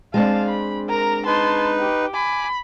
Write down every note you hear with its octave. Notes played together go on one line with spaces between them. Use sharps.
G#3 C4 D4 F5 A5
B5
A#4 A#5
D#4 B4 A5 C6
G4
G#5 B5 D6